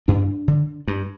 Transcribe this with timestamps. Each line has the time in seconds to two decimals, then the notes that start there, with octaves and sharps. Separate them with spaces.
0.08 G2 D4
0.48 D3
0.88 G2